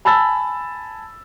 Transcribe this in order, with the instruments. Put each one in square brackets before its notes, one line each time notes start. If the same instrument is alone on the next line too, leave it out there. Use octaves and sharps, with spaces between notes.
[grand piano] G#5 A5 B5 E6 A6